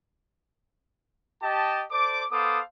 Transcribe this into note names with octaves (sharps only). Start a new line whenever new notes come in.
G4 D#5 A5
A4 C5 D5 D6
B3 A4 C5 F5 D6 D#6